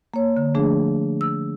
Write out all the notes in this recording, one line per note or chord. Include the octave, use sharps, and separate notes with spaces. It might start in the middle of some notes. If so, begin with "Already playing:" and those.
A#3 C#5
D3
F3 A3 D4 G#4
E6